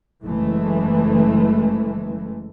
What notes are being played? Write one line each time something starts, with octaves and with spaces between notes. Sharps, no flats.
F#1 E3 G#3 A3